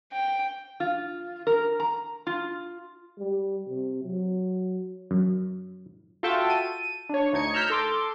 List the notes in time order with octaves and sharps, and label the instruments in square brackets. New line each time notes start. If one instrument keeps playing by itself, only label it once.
[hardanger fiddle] G5
[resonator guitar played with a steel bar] F4
A#4
A#5
F4
[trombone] G3
C3
F#3
[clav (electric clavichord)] F#2
[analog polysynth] F4 F#4 A4 E5 G5 A5
D#7
D4 C#5
D2 D#4 G#6 C#7
A#5 E6 F6 G6 B6
A4 C6 D6